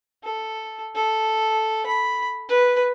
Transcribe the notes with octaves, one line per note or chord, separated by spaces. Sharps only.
A4
A4
B5
B4